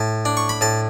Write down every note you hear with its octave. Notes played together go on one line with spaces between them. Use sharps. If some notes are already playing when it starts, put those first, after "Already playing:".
Already playing: A2 A5
D4
C#6
B5
A2 A5